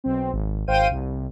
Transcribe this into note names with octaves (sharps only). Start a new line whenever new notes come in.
B1 C4
G#1
G#1 C5 F5 G5 D#7
C2